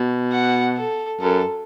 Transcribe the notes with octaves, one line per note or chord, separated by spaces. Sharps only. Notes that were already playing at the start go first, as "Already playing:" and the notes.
Already playing: B2
F#5
A4
F#2 A4